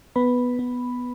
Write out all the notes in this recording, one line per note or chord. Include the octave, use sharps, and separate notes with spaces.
B3 B4 B5
B3